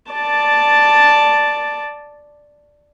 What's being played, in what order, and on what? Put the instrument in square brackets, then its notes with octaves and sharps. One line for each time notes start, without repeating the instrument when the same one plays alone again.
[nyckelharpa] D5 A5